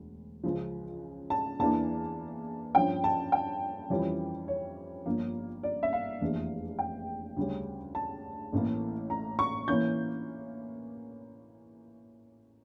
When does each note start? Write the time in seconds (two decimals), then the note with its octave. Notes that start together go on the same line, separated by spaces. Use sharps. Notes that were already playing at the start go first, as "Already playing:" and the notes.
Already playing: E1 D2
0.43 C#2 C#3 F3
1.30 A5
1.59 E2 E3 A#3 D4 A5
2.75 G2 F3 C#4 G5
3.04 A5
3.32 G5
3.90 F2 E3 G3 C#4
4.48 C#5
5.06 G1 G2 F3 A#3
5.63 D5
5.83 E5
5.93 F5
6.21 F1 E2 E3 A#3 D4
6.79 G5
7.37 D2 C#3 G3 C#4
7.95 A5
8.52 A1 A2 E3 A#3
9.10 A#5
9.39 C#6
9.68 E3 A#3 C#4 G6